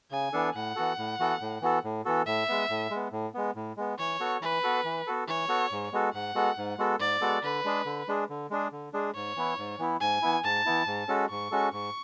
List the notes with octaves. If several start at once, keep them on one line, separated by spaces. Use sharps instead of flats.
C#3 G#5
E3 B3 D4 A4
A2 F#5
E3 B3 F#4 A4
A2
E3 B3 F#4 A4
A2
E3 B3 F#4 A4
A2
E3 B3 F#4 A4
A2 E5
G#3 B3
A2
G#3 B3
A2
G#3 B3
A2
G#3 B3
E3 C#5
B3 F#4 A4
E3 B4
B3 F#4 A4
E3
B3 F#4 A4
E3 C#5
B3 F#4 A4
G#2
G#3 B3 F#4 A4
G#2 F#5
G#3 B3 F#4 A4
G#2
G#3 B3 F#4 A4
G#2 D5
G#3 B3 F#4 A4
D3 B4
G#3 D4 G#4
D3
G#3 D4 G#4
D3
G#3 D4 G#4
D3
G#3 D4 G#4
G#2 C#5
E3 B3 E4
G#2
E3 B3 E4
G#2 G#5
E3 B3 E4
G#2 A5
E3 B3 E4
G#2
G#3 C#4 F#4 A4
G#2 C#6
G#3 C#4 F#4 A4
G#2 C#6